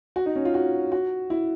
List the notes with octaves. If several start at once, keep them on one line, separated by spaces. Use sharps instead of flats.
F#4
D#4
C#4
F4
F#4
F#4
E4